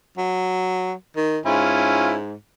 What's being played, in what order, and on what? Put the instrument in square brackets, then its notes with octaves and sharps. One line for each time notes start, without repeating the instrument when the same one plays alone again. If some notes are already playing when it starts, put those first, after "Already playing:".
[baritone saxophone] F#3
D#3
[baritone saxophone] G#2 [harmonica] C#4 E4 F4